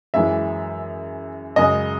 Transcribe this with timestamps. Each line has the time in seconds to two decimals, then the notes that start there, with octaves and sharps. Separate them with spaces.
0.14 F#2 E3 G#3 E5
1.56 F#2 C#3 G#3 D#5